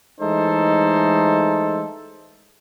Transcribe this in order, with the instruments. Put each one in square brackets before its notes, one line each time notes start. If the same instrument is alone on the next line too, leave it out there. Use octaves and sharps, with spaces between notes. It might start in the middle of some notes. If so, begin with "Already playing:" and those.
[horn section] E3 G#3 A3 D#4 A4 C5